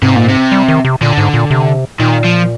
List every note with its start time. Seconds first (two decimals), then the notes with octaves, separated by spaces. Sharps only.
0.02 G#2 C3
0.16 A#2
0.28 C3
0.52 G3
0.68 D#3
0.85 C3
1.01 A#2 D3
1.18 G#2
1.34 A#2
1.50 C3
2.00 A#2 D#3
2.24 F3